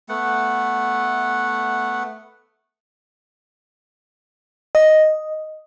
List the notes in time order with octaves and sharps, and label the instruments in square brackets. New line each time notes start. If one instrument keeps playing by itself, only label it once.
[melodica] A3 B3 F#5
[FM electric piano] D#5